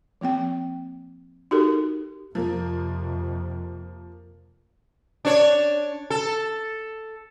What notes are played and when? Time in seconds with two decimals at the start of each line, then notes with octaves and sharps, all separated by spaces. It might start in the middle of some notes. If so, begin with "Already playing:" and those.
0.21 F3 A#3 C4 G5
1.51 D#4 F#4 G4 A4 A#4
2.35 F2 C3 F3 A#3
5.25 D4 C#5
6.10 A4